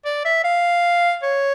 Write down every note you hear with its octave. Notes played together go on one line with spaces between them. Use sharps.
D5
E5
F5
C#5